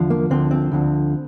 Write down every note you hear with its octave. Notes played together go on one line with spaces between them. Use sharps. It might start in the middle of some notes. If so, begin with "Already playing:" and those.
Already playing: E2 D3 F3
A#3
D2 D3 F3 C4
C4
D2 D3 F3